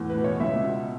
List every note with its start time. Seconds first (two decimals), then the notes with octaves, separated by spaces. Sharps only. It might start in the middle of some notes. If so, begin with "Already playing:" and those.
Already playing: E2 A2
0.10 B4
0.17 B2
0.24 C#5
0.40 C#2 E5
0.64 B2